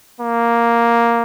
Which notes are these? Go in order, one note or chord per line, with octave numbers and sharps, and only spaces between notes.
A#3